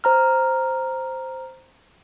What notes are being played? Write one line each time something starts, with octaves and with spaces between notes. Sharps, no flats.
C5 A#5 F6